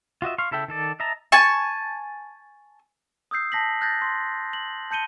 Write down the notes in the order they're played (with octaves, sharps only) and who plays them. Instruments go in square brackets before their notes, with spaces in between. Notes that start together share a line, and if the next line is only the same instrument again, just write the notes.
[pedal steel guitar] F4 F#4 D#5 E5
F5 C6 C#6
C#3 E4 A4 E5 G5
D#3 A4 D5
D#5 E5 A5 A#5
[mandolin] G#5 A5 C#6
[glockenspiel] D#6 E6 G6 C7
A5 A#6 B6 F#7
F#6 G6 A6 A#6
C6
F#7
A5 G6 C#7 D#7 G7